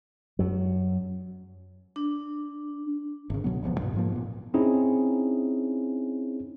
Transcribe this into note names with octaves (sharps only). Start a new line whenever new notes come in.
F#2 F#3
D4
G#1 C#3
C#2 B2 F#3 B3
E1 C#2 F3 B3
G2 B2
G#2 F3 A#3
A#2 B3
C4 C#4 D#4 E4 G#4